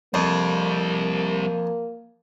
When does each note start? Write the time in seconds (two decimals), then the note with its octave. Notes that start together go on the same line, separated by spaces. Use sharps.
0.14 F2 G3 A#3 C4